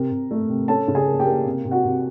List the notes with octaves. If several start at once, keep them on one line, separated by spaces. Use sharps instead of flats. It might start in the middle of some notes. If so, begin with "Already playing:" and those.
Already playing: C3 A#4
C3
A3
C3
C#4 A4 A5
C#3
G#4 G#5
A#3
G4 G5
A#3
C3
C3
F#4 F#5
C3